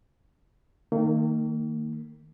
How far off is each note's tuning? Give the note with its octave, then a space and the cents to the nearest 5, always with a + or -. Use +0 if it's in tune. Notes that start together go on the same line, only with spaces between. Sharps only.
D#3 +0 A#3 -35